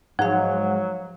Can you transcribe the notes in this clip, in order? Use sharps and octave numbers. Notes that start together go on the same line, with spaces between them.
G#2 F3 F#3 F5 F#5